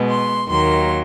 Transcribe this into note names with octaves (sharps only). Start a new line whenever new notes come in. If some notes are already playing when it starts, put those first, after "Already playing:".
Already playing: B2 G#3 B3
C6
D#2 D#3 F#3 A#3 C6